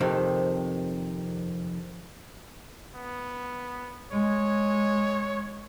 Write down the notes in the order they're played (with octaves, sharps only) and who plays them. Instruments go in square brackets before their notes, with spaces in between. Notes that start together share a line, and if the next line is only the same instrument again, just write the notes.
[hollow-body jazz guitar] F2 C3 D#3
[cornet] B3
[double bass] G#3 [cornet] C#5